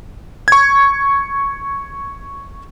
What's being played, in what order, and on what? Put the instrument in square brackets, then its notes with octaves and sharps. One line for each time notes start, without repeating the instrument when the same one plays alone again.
[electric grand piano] C#6 G#6